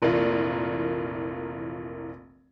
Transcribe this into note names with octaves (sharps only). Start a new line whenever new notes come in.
F1 A#1 E3 A#3 F4 A#4